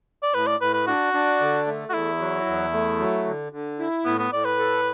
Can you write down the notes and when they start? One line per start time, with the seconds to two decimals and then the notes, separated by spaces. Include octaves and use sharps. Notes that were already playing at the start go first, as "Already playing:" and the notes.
0.23 D5
0.34 A2 B4
0.47 D5
0.60 A2 B4
0.73 B4
0.87 D4 F#4
1.13 D4
1.40 D3
1.67 A3
1.90 F#4
1.93 E2 E4
2.19 F#3
2.46 E2
2.73 A3
3.00 F#3
3.26 D3
3.52 D3
3.79 E4
4.05 A2 B3
4.19 B3
4.32 A2 D5
4.45 B4
4.59 A4